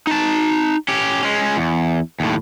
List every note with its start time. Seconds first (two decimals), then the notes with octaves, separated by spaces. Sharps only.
0.07 D#4 A5
0.88 C#4 G4
1.23 G#3 C#4
1.57 E2
2.20 D#2 A2